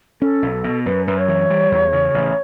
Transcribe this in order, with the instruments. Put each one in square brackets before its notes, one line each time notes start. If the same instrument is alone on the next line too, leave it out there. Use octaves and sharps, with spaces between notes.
[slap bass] C#4 [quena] A4
[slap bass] B1
B2
[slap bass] F#2 [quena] B4
[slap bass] F#2 [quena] B4
[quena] C#5
[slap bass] E3
G3
E2
C#3
A1